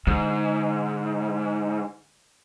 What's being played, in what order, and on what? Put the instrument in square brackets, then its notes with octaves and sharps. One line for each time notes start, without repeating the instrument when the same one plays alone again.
[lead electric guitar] G#2 [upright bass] D3